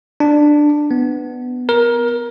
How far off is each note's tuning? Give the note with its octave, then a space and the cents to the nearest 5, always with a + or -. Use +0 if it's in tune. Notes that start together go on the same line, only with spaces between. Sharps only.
D4 +10
B3 +10
A#4 +20